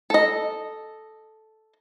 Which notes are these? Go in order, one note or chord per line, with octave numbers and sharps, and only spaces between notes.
A4 D#5